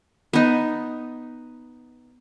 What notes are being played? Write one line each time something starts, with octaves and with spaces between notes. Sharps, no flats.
B3 D#4